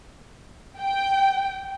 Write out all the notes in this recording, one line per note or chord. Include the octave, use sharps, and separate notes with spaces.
G5